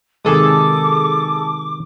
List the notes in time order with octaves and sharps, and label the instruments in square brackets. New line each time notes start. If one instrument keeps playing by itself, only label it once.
[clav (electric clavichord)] C3 D#3 G#3 [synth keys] G#4 A4 D#6 [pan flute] D6